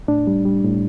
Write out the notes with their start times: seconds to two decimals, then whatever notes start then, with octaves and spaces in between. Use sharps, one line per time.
0.08 A2 D4
0.27 G3
0.45 G3
0.64 A2